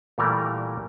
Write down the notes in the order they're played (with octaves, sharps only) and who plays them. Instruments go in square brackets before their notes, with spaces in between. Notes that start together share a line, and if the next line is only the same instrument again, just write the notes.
[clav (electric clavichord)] A#2 E3 G3 A3 A#4 D5